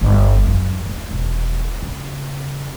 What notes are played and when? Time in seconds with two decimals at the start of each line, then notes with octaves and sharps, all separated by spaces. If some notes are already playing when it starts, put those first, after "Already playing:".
0.01 G1
0.47 F#2
0.86 D2
1.11 E1
1.82 C#3